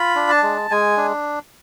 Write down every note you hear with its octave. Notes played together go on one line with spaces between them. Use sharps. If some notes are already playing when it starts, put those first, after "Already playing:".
Already playing: F4 B5
D4
A5
G#3
G#3 G#5
D4